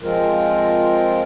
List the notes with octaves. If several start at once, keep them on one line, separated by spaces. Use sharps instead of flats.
F3 G#3 C4 F4 A#4